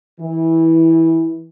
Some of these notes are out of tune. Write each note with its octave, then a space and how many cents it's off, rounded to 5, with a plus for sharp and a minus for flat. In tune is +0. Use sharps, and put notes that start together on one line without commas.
E3 -15